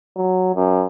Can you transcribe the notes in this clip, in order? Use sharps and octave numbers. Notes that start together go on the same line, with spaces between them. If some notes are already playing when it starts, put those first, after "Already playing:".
F#3
F#2